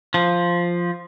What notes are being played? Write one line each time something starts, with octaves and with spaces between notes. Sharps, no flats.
F3